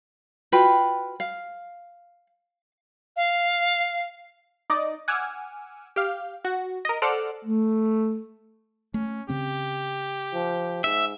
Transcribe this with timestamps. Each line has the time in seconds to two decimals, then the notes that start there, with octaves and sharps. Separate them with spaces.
0.52 F4 F#4 B4 G5
1.20 F5
3.16 F5
4.70 D#4 D5 D#5
5.08 F#5 G#5 D6 E6 F6
5.96 G4 F5
6.45 F#4
6.85 A#4 D#5
7.02 A4 C5 D5 F#5 F6
7.44 A3
8.94 A3 C#4
9.29 C#3 C4 C#4 G4
10.34 F3
10.84 G#2 E5